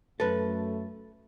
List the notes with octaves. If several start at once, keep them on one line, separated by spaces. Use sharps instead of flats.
F#2 A3 A4 B4